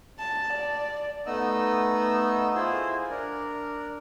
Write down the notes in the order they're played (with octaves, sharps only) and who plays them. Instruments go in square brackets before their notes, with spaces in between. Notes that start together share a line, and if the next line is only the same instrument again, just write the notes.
[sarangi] A5
D5
[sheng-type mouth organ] A3 B3 D#4 D#5 E6
E4 F4 G#4 C5 G#5
D4 A#4